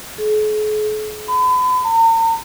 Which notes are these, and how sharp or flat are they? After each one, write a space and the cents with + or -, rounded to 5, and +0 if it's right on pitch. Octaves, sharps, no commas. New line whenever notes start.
G#4 +45
B5 +35
A#5 -45